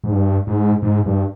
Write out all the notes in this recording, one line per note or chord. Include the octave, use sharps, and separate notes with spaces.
G#2
G2
G#2
G#2
G2